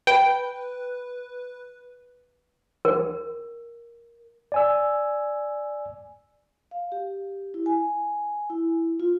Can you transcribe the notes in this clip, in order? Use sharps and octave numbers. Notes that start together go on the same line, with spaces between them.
B4 G5
A#4
D5 G#5 E6
F5
G4
E4
G#5
E4
F4